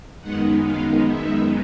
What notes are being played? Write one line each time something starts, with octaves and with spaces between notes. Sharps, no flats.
F#2 D#3 G#3 B3 D#4 F#5
F5
E5